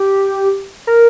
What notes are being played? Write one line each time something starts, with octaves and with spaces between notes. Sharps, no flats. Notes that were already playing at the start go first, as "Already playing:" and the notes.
Already playing: G4
A#4